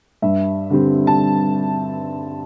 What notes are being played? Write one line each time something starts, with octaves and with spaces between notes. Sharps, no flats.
G2 E5
D3 G3 C4
A5